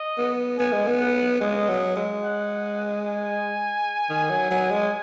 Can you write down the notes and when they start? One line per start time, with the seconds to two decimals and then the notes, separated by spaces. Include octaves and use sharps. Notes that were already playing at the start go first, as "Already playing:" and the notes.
Already playing: D#5
0.18 B3
0.59 B3 G#5
0.73 G#3
0.87 B3
1.00 F#5
1.41 G#3 D#5
1.69 F#3
1.96 G#3
2.24 F#5
3.05 G#5
4.10 D#3
4.30 F#3
4.51 F#3
4.71 G#3